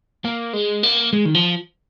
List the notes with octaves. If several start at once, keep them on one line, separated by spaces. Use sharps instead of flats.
A#3
G#3
A#3
G#3
D#3
F3